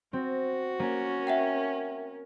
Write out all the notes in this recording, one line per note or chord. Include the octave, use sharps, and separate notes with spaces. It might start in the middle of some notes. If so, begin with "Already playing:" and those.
C4 F#4
A#3 C#4 A#4
E5 F#5 G5